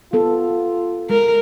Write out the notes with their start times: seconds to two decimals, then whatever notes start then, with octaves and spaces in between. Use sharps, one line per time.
0.13 B3 F4 A4
1.10 G#3 A#4